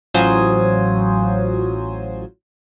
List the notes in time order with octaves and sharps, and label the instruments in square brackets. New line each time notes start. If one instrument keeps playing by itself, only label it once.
[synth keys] A1 F#3 F4 C5 G#5 D#6